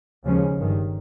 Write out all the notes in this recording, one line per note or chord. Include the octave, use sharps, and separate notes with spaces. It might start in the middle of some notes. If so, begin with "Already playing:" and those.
D#2 C#3 F3 G#3 C#4
G1 G2 D#3